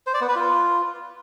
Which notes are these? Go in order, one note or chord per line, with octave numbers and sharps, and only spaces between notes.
C5
D5
B3
B4
F4